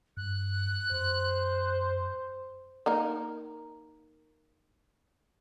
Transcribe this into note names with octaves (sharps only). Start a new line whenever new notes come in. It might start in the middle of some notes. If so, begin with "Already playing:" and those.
G2 F#6
F#2 C5
A#3 D#4 A#4